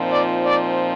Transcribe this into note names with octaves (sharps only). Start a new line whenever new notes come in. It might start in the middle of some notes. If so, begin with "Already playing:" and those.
Already playing: A#2 F3 C4 D#4
D5
D5